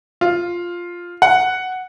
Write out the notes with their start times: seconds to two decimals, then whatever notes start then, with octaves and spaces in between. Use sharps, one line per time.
0.21 F4
1.22 F#5